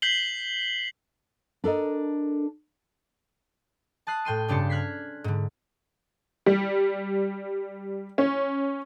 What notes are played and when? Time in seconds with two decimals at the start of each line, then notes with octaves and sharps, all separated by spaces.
0.02 G6 B6 C7 F#7 G7
1.64 D4 A4 A#4 D#5
4.07 A5 D#6 F#6 C7
4.25 A2 G5 C6 D#7
4.48 G2 C#3 D4 G4 C6 C#7
4.70 F6 F#6 G#6 B6 C7
5.24 G#2 D3
6.46 G3
8.18 C#4